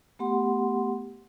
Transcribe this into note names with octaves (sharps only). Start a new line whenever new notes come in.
A3 B3 G4 F#5 C6